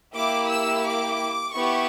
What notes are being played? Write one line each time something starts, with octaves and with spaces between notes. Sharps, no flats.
A#3 E4 G4 D6
E6
D6
B3 E4 G4 C#6